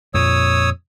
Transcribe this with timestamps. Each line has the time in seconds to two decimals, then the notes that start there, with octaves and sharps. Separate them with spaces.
0.14 F2 A#2 C#5 D#6 E6